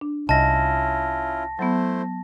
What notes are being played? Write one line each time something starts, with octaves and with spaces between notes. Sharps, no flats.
D4
C2 C#4 E4 F4 D#5 A5 A#6
F#3 A3 B3 E4 C5